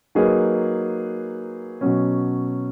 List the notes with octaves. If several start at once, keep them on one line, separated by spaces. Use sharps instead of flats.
F#3 A#3 D#4 G#4 B4
B2 F#3 C#4